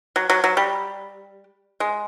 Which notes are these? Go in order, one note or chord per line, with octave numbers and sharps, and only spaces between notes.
F#3
F#3
F#3
G3
G#3